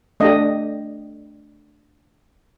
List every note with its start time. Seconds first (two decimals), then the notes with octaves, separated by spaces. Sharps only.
0.20 A3 D4 G4 D#5